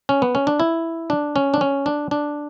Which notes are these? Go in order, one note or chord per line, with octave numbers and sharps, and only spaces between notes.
C#4
B3
C#4
D4
E4
D4
C#4
D4
C#4
D4
D4